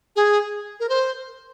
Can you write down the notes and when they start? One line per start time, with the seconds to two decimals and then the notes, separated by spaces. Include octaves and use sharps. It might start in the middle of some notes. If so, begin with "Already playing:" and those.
0.16 G#4
0.80 A#4
0.89 C5